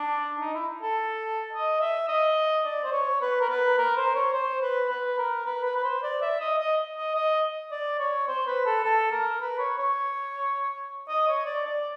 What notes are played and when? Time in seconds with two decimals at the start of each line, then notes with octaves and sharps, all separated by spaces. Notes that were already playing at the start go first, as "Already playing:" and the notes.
Already playing: D4
0.40 D#4
0.54 E4
0.82 A4
1.53 D#5
1.81 E5
2.08 D#5
2.65 D5
2.84 C5
2.92 C#5
3.21 B4
3.41 A#4
3.49 B4
3.78 A#4
3.97 C5
4.15 C#5
4.33 C5
4.62 B4
4.90 B4
5.18 A#4
5.46 B4
5.64 B4
5.77 B4
5.84 C5
6.03 D5
6.22 E5
6.40 D#5
6.59 D#5
6.97 D#5
7.15 D#5
7.71 D5
7.99 C#5
8.28 C5
8.47 B4
8.66 A4
8.84 A4
9.12 A#4
9.41 B4
9.59 C#5
9.78 C#5
11.09 D#5
11.28 C#5
11.46 D5
11.65 D5